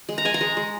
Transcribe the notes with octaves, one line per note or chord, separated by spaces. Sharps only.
G#3
A#5
G#3 G#5
A#5
G#3
G#3